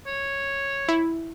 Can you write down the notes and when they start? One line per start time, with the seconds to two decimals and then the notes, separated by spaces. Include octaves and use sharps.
0.07 C#5
0.89 E4